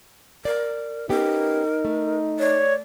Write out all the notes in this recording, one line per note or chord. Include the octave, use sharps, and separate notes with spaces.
A#4 D5
B3 C#4 D#4 G4 A#4
A3
C#5 D5